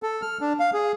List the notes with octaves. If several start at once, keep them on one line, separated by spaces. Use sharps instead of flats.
A4
F6
D4
F5
G#4